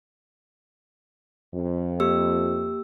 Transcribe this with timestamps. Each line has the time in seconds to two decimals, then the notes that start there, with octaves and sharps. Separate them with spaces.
1.54 F2
2.00 A#3 G4 E6